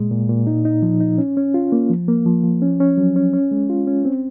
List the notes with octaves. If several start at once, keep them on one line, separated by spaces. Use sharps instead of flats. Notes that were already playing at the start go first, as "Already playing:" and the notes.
Already playing: A#2 G#3
A#2
A#2
D#4
D#4
F3
D#4
C#4
C#4
F4
A#3
F3
A#3
F3
F3
C#4
C#4
F#3
C#4
C#4
G#3
F4
C#4
C4